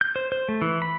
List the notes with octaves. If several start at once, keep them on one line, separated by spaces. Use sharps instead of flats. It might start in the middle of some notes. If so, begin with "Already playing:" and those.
G6
C5
C5
A3
E3
B5